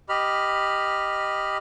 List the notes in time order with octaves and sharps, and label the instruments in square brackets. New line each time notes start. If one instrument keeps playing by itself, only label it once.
[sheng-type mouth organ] G4 D#5 B5 F6